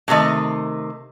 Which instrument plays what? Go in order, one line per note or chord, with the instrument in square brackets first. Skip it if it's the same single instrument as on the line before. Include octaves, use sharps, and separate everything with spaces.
[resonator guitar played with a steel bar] A2 C3 D#3 A3 D#5